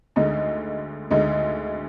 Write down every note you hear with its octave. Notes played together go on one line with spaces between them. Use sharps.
D2 D3 G#3 D#4
D2 D3 G#3 D#4